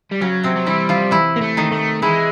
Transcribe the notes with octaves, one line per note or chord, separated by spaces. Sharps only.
G3
C#3 F#3 C#4
C3 C4
F#3
E3 G3 E4
F3 F4
E3 E4
A#3
A3
D#3 D#4
A3
E3 G#3 E4